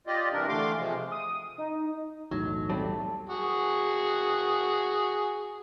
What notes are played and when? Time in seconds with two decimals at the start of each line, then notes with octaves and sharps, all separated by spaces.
0.07 F4 G4 D5 D#5
0.33 C3 E3 G3 D4 A#4
0.48 D3 E3 A3 F5 C6 D6
0.78 C3 F3 G#3
1.12 D#6
1.58 D#4
2.31 B1 E2 A2 F#3 D#4
2.70 G3 A3 C4 A5
3.29 F#4 G#4